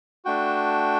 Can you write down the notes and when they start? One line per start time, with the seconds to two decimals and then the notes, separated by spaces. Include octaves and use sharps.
0.25 A3 D4 F#4 G5